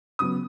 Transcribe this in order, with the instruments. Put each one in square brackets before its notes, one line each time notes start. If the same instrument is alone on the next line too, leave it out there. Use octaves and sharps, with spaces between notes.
[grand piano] C#3 F#3 B3 [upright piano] D#6